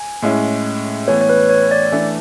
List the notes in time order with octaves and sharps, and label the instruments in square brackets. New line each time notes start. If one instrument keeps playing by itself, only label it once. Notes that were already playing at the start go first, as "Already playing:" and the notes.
Already playing: [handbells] G#5
[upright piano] A2 G#3 C#4 E4
[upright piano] A2 E3 B3 [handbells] C#5
[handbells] C#5
B4
C#5
D5
[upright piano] E3 A3 D4